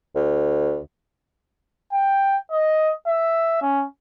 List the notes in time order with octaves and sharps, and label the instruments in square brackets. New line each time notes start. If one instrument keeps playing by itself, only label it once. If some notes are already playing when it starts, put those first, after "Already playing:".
[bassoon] D2
[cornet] G5
D#5
E5
C#4